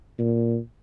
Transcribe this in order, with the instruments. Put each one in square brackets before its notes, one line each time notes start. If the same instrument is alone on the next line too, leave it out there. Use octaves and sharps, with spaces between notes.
[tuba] A#2